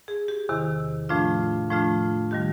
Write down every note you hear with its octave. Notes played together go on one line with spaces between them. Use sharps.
G#4
G4
E2 C3 D#3
A2 F3 A3 D4 F4
A2 F3 A3 D4 F4
D#3 G3 G4